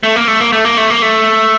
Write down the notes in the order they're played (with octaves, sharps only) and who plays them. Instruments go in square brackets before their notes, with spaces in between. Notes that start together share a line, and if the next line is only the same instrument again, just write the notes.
[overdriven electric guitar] A3
A#3
A3
A#3
A3
A#3
A3
A#3
A3